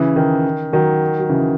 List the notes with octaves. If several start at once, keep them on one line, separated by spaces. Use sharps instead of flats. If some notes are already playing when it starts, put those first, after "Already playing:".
Already playing: C#3 E3
D#3
D#3 F#3
F#3
C#3 E3